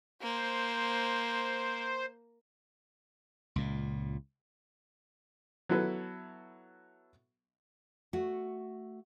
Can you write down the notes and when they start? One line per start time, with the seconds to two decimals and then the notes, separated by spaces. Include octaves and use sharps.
0.22 A#3 C5
3.56 C#2 A#2
5.69 F#3 B3 E4 F#4 A4 B4
8.13 A3 F#4